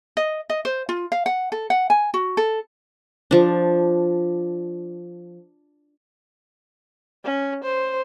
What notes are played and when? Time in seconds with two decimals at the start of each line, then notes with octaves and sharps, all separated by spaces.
0.17 D#5
0.50 D#5
0.65 C5
0.89 F4
1.12 F5
1.26 F#5
1.52 A4
1.70 F#5
1.90 G#5
2.14 F#4
2.37 A4
3.31 F3 D4
7.24 C#4
7.64 C5